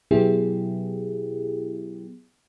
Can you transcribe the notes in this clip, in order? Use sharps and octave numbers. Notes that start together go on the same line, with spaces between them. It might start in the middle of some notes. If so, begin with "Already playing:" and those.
B2 F#3 B3 E4 G4 G#4